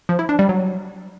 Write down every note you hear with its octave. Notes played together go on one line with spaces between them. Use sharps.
F3
E4
D4
G3
F#3